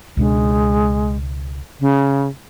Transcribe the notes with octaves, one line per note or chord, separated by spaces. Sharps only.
C#2 B2 G#3 D4
C#3